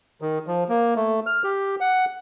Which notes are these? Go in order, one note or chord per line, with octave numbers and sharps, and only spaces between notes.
D#3
F3
A#3
A3
F6
G4
F#5